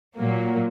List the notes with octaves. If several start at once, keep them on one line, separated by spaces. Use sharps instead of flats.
A#2 F#3 A#3